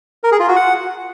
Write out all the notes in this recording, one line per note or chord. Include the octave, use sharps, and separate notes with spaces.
A#4
G#4
F4
F#4
F#5